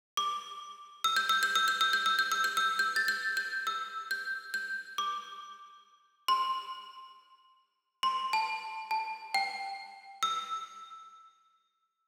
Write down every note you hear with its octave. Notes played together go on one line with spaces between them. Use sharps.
D6
E6
G6
E6
G6
E6
G6
E6
G6
E6
G6
E6
G6
E6
G6
A6
G6
G6
E6
G6
G6
D6
C6
C6
A5
A5
G5
E6